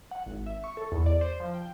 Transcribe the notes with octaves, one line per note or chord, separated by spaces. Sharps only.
F#5
G#1
E5
C#6
A4
E2
D5
C5
F3
G5